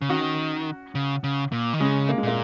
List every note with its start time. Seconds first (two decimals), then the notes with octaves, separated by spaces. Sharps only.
0.02 C#3
0.09 D#3 C#4 F#4
0.95 C#3
1.24 C#3
1.52 A#2
1.73 D#3
1.80 C#3 G#3 C#4
2.09 A#3
2.18 G#3
2.23 A#2 A#3